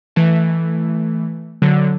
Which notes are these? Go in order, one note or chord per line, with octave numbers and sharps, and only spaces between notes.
E3 A3
D3 F#3